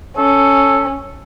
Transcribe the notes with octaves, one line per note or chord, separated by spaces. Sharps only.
C#4 A4